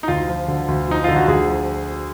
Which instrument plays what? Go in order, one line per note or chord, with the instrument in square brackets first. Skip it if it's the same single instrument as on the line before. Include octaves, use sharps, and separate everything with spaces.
[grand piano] D#4
D2 F4
F3
D3
D2
F3 D#4
D3 F4
F#4
D2 G#4
F3